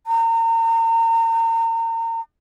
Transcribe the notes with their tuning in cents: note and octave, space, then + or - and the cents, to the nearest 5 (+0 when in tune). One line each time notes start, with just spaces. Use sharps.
A#5 -35